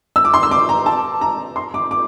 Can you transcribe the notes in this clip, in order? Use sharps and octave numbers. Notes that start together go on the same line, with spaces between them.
E6
D6
C6
E6
D6
A#5
A5
A#5
C6
D6
D6